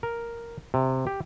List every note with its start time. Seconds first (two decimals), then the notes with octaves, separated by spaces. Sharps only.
0.03 A#4
0.74 C3
1.07 G4